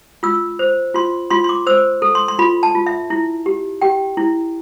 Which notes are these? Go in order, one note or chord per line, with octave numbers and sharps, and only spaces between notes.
F4 E6
C5
F4 C6
F4 C6
C6
D6
C5 E6
A4
C6
C6
F4 B5
A5
F4
E5
E4
G4
G4 G5
E4